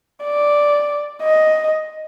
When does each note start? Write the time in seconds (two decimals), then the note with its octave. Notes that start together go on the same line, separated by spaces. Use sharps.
0.24 D5
1.22 D#5